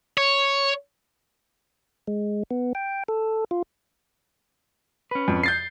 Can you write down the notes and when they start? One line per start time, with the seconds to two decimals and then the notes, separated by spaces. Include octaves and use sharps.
0.18 C#5
2.07 G#3
2.51 B3
2.75 G5
3.08 A4
3.51 F4
5.11 C#4 B4
5.28 F2
5.43 G6 A6 C7